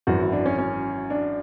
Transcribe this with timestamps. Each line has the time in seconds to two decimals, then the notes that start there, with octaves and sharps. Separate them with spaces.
0.07 G#1 F#2 E3 F#4
0.20 E4
0.33 D4
0.46 C#4
0.58 C#4
1.10 D4